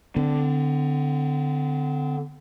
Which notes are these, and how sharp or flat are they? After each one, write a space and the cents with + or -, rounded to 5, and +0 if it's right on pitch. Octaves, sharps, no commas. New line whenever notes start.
D3 +0 C4 -40